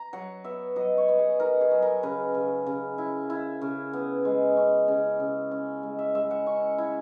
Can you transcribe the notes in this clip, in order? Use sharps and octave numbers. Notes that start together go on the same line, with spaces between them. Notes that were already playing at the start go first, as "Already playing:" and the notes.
Already playing: A#5
F#3 F#5
B3 E5
F#3 D#5
C#5
B3
G#4
D#4 A#4
G#4
F#3
A#4
C#3 B4
C#3
C#3
E4
E4
C#3
B3
G#3
C#4
C#3
C#3
C#4
G#3
E5
G#3 E5
F#5
C#4 C#6
E4